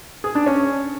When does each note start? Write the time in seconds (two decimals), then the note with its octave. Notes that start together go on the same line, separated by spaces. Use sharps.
0.24 G#4
0.35 D4
0.46 C#4